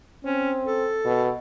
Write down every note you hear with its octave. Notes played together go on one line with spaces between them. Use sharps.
C4 C#4
A4
B2